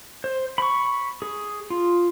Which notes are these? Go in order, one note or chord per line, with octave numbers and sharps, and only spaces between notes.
C5
B5 C#6
G#4
F4